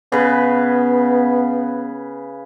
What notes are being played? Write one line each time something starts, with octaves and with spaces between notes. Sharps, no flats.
C#3 B3 B4